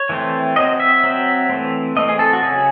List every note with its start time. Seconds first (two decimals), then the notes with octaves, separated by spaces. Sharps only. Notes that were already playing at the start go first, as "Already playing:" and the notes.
Already playing: C#5
0.09 E3 A3 C4
0.56 F#3 C4 D#5
0.80 E5
1.03 F#3 C4
1.50 E3 A3 C4
1.96 E3 A3 C4 D#5
2.09 G#4
2.19 A4
2.33 F#4
2.42 C#3 F#3 C#4 G#4